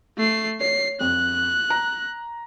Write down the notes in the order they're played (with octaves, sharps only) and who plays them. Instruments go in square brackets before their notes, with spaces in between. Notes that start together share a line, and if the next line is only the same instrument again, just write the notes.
[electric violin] A3 C7
[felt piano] C#5 [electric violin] C7
[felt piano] F2 [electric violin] F#6
[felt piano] A#5